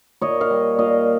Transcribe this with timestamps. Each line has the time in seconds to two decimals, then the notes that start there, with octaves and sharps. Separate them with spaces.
0.21 A#2 C#5 D#5
0.41 D#5 F5
0.50 G3
0.78 A#2 D#5 F5